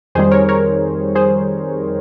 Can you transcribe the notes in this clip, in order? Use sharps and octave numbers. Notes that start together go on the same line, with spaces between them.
F2 D#3 G3 G#4 C5
A#4 C#5
A#4 C#5
G#4 C5